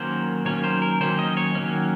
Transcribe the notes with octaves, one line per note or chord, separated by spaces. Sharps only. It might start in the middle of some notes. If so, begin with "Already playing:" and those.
Already playing: D#3 F#3 A#3 C#4 C5
D#3 F#3 A#3 C#4 C#5
C5
A#4
D#3 F#3 A#3 C#4 C5
D#5
C#5
D#3 F#3 A#3 C#4